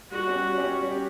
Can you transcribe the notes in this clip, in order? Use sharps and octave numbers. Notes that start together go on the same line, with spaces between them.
G3 F#4
C#4 G4
G3
C#4 G4
G3
C#4 G4